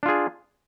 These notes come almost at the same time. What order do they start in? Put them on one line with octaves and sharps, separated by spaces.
D4 F4 G#4